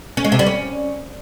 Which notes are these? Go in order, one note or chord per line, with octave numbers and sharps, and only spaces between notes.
C#4
G#3
C3
G3
C#4